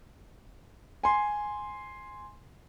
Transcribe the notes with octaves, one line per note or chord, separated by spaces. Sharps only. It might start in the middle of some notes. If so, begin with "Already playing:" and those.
G#5 C6